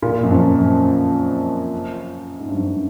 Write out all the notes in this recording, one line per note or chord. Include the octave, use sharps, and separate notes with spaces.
A#2
F#2
F2
F#2
G#2
G2
F#2